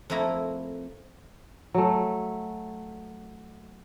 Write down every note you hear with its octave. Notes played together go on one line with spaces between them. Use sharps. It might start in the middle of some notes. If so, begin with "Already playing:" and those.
F2 A3 A#3 E4 A#5
F#3 A3